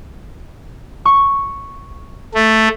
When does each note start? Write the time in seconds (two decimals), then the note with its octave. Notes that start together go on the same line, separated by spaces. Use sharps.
1.05 C#6
2.34 A3